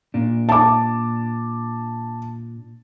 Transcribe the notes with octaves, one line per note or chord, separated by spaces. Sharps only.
A#2 D4
A5 D6